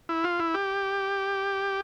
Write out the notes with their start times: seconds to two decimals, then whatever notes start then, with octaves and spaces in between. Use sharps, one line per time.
0.09 E4
0.24 F4
0.40 E4
0.54 G4